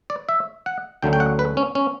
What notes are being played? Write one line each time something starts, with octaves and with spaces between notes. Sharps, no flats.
D5
E5
F#5
D2 D3 F#3 A3 C#4 G5
G5
F#5
B4
C#4
C#4